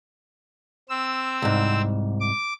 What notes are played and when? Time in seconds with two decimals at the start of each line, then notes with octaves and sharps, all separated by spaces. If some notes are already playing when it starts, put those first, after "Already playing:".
0.89 C4 E6
1.42 C2 G#2
2.20 D6